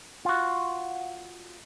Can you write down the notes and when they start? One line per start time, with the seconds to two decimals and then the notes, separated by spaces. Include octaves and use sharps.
0.25 F4 F#4